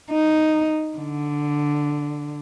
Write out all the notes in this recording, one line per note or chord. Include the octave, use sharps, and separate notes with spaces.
D#4
D3